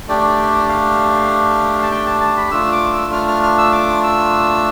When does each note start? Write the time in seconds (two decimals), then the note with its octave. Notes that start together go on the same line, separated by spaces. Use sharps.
0.08 A3 D4 G4 D5
0.69 F5
1.83 A5
1.91 G5
2.06 A5
2.21 A5
2.37 B5
2.51 A3 D4 F4 E6
2.72 D6
2.92 E6
3.13 F6
3.28 F6
3.43 F6
3.58 E6
3.72 D6
4.03 E6